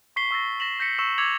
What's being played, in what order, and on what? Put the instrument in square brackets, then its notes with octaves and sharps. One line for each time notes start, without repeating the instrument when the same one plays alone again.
[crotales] C#6 B6 C7 G7
C#6 E6 A6 A#6
A#6 B6 E7 F#7
G6 A#6 B6 C#7
C#6 E6 E7
D6 E6 G#6 C#7 F7 F#7